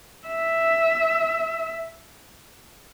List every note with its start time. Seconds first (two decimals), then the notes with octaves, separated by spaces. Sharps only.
0.27 E5